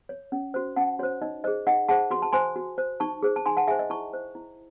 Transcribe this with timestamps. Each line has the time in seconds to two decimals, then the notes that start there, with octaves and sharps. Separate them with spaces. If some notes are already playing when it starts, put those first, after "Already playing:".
0.09 C#5
0.32 C#4
0.54 F#4 C5
0.76 C#4 F#5 A5
0.99 F#4 C#5
1.03 C5
1.22 D#4 D#5
1.44 G#4 C5 D#5
1.67 D#4 D#5 F#5
1.89 G#4 C5 F#5 A5
2.11 F#4 C6
2.22 A5
2.33 C5 G#5 C6
2.56 F#4
2.78 C5
3.00 D#4 A5 C#6
3.23 G#4 C5
3.36 A5
3.46 D#4 G#5 C6
3.57 F#5 A5
3.67 G#4 E5 G#5
3.71 C5
3.79 D#5
3.90 E4 A5 C#6
4.13 C5
4.35 E4